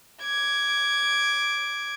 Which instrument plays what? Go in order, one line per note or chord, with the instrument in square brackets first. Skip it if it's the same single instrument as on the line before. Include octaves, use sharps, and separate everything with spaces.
[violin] D6 G#6